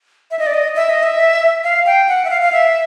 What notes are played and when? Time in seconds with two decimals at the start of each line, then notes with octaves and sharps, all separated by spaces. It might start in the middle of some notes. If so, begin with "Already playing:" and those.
0.31 E5
0.39 D#5
0.46 D5
0.54 D#5
0.76 E5
0.89 D#5
1.03 E5
1.64 F5
1.86 G5
2.09 F#5
2.25 E5
2.30 F5
2.42 F5
2.52 E5